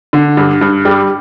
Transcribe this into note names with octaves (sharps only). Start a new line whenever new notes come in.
D3
G2
G2
G3